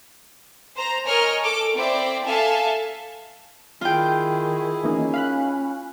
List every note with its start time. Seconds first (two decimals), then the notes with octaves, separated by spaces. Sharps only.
0.76 C5 A#5
1.06 A#4 C#5 D#5 G#5 F6
1.42 A4 D6
1.76 C4 E4 C5 D5 G5
2.26 A4 E5 F5 G#5 A5
3.81 D#3 E4 F4 G#4 G5
4.84 E3 A#3 C#4 D#4
5.14 F5 B5 F#6